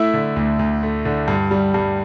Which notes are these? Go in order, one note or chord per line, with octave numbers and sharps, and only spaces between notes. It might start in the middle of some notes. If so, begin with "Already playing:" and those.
Already playing: A3 E4 E5
D3
D2
D2
A3
D3
G2
G3
G2